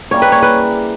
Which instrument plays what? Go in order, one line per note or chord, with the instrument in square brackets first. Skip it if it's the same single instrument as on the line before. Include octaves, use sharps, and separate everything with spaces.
[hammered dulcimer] C#3 G3 A#3 E4 [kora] C#5
[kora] B4
C#5
B4